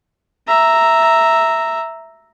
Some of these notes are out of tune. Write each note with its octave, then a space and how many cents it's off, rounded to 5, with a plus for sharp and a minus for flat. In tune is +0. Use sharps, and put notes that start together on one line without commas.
E5 +0 A#5 -5